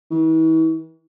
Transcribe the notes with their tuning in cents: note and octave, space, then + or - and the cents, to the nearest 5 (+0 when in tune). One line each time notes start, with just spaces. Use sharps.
E3 -40